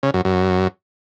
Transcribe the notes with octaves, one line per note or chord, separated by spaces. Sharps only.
C#3
F#2
F#2